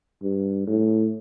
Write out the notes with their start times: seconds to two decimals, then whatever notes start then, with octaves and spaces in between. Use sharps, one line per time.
0.22 G2
0.67 A2